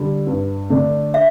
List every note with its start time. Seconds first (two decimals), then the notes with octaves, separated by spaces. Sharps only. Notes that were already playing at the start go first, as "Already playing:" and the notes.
Already playing: D3 G3
0.27 G2
0.70 D3 A3 D4
1.14 E5